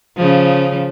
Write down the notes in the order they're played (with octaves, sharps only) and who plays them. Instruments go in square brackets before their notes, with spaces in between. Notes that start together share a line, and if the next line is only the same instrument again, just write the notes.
[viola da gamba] C#3 F3